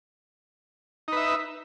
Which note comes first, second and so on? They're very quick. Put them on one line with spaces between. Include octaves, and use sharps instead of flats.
D#4 B4 E5